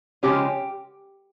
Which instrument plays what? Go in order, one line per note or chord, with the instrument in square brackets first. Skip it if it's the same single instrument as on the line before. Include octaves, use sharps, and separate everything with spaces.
[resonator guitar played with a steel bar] C#3 F3 G#3 C#4 G4